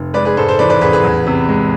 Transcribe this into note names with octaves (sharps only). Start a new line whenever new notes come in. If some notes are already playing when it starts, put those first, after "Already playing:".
Already playing: F1
G#3 B4 D5
G#4 B4
G#2 A4 C5
A4 C5
E3 B4 D5
B4 D5
A1 G#4 B4
G#4 B4
E2
C3
G#3